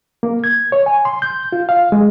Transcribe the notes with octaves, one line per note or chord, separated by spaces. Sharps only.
A#3
G#6
C#5
G#5
C6
G6
F4
F5
G#3